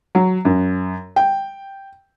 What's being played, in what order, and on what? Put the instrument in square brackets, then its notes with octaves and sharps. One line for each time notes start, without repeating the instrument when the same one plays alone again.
[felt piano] F#3
F#2
G5